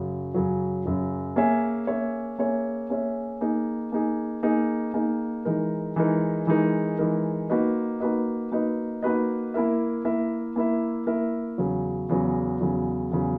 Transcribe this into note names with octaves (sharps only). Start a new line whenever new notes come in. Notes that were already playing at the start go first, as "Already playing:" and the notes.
Already playing: F#2 C#3 F#3
F#2 C#3 F#3
F#2 C#3 F#3
A#3 C#4 G#4 C#5 E5
A#3 C#4 G#4 C#5 E5
A#3 C#4 G#4 C#5 E5
A#3 C#4 G#4 C#5 E5
A#3 D#4 G#4
A#3 D#4 G#4
A#3 D#4 G#4
A#3 D#4 G#4
E3 G#3 D#4 A#4
E3 G#3 D#4 A#4
E3 G#3 D#4 A#4
E3 G#3 D#4 A#4
A#3 D#4 F#4 B4 D#5
A#3 D#4 F#4 B4 D#5
A#3 D#4 F#4 B4 D#5
A#3 D#4 F#4 B4 D#5
A#3 E4 A#4 E5
A#3 E4 A#4 E5
A#3 E4 A#4 E5
A#3 E4 A#4 E5
E2 C#3 F#3
E2 C#3 F#3
E2 C#3 F#3
E2 C#3 F#3